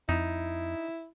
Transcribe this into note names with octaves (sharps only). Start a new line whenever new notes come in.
F2 D#4 E4